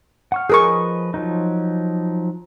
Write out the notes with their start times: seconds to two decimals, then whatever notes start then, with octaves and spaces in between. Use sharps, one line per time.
0.32 F#5 C#6 F6
0.50 F3 G#4 A#4 B4 D#5 C#6
1.14 F3 F#3 D#4